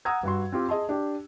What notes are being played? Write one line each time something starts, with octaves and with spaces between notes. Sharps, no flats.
F#5 A#5 D#6 E6 G#6
G2 F#4 C6
C4 F4 G4
G#4 D#5 A5 C6
D4 G4